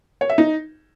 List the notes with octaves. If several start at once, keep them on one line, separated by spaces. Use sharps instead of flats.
C#5
E5
D#4